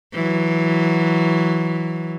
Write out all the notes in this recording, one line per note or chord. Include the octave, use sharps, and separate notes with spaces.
E3 F#3